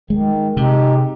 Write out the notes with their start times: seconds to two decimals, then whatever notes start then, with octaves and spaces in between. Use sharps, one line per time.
0.10 D#3 G#3
0.56 C3 G#3 D#4 G4